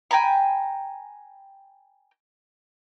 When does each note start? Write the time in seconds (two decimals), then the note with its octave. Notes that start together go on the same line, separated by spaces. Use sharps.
0.11 G5 G#5 A#5 B5